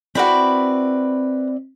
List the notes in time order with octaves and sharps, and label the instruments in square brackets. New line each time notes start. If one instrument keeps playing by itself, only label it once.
[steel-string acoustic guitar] C4 E4 D5 [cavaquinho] F#4 B4 B5